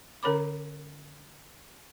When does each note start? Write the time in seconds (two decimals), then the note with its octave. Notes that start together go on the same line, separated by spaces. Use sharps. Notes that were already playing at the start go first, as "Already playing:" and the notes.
0.23 D3 C#4 A#4 C#5 B5 D6